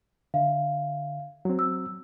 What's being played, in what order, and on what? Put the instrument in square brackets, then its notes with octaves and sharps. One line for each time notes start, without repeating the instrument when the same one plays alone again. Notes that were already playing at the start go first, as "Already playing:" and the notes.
[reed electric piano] D3 [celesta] E5 F5
[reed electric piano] F#3 C4
[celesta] E6